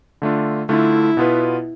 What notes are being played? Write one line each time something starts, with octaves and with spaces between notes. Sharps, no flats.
D3 A3 D4 F4
D3 A3 D4 E4 F4
B2 B3 F4 B4